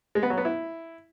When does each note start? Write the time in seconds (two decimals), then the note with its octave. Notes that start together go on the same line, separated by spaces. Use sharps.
0.15 G#3
0.23 B3
0.30 F#3
0.38 B3
0.45 E4